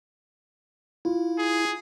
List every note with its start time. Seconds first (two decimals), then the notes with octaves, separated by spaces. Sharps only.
1.05 E4 F4
1.38 G#4